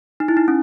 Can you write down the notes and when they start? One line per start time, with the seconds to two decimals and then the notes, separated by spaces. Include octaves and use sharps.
0.20 D#4
0.28 E4
0.37 D#4
0.48 C#4